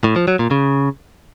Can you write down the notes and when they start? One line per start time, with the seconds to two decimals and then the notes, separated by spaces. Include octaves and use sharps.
0.04 A2
0.16 F3
0.28 F#3
0.39 A#2
0.51 C#3